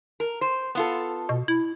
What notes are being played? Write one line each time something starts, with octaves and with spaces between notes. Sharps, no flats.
A#4
C5
B3 F4 A4
B2
E4